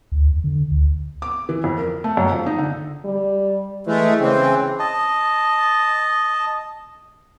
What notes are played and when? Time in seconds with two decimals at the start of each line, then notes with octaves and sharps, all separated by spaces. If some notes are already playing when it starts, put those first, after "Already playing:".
0.12 D2
0.28 E2
0.44 D3
0.71 D2
1.22 D6
1.49 E3
1.64 F2
1.78 A#4
2.04 A3
2.17 F#2
2.32 F3
2.46 D#4
2.58 D3
3.05 G3
3.87 E3 G#3 A3
4.21 C#3 E3 C4
4.79 D#5 A5